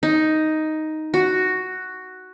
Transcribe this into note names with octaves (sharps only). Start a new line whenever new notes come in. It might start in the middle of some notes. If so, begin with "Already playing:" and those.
D#4
F#4